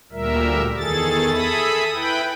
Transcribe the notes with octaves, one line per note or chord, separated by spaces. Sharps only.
D2 A#2 G3 A#4 E5
E2 D#3 G#4 A4 A6
G#4 A4 E5 B5 D#6
E4 B4 G5 B5